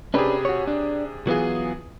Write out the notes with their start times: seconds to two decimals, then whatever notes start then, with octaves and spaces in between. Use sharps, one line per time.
0.14 C3 C#4 D4 G4 G#4 B4
0.45 F#4 C#5
0.68 D4
1.27 E3 F#3 B3 F4 G#4